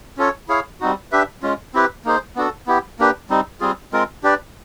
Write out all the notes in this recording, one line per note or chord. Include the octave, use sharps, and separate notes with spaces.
C#4 F4 A4 C#5
E4 G#4 C#5 F5
G3 C4 D#4 F#4
D4 G4 B4 E5
G#3 C#4 F4
C4 E4 G4 B4
A#3 D#4 G#4 C5
B3 D4 F#4 A4
B3 E4 G4
A#3 D4 G4 B4
G3 C4 D#4
G3 C4 F4 G#4
G#3 C4 F4 A#4
D4 G4 B4 D5